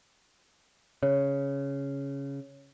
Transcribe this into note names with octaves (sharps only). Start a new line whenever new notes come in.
C#3 C#5